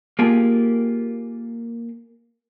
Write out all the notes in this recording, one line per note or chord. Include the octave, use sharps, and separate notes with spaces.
A#3 F4 G4 G#4